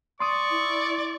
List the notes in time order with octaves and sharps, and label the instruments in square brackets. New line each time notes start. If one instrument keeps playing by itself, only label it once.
[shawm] D5 [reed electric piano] C6 D#6 [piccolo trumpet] C#6
[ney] E4